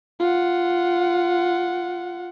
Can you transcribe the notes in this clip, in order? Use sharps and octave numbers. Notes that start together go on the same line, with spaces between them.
F4 F#5